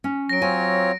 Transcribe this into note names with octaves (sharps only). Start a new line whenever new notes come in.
C#4
F#3 A#6 D7
C4 F4 C#5 G#5